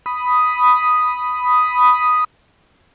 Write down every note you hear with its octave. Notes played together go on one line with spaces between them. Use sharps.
B5 D#6